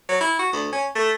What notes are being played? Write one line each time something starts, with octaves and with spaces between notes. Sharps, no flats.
F#3
E4
F#4
D2
C#4
A3